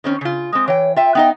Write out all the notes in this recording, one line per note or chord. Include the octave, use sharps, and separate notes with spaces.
D#3 C4 C#4
C#3 F4
G#3 C4 D#6
E3 C#5 G5
F4 E5 G5
B3 D#4 D#5 G5